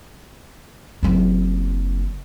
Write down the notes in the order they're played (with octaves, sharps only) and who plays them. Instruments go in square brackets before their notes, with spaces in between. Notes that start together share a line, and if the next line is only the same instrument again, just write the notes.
[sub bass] F#1 [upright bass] F#3 C4